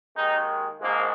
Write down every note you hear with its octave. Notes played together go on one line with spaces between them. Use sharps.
D#2 D#3 G#3 D#4
A#1 G#2 G#3 A#3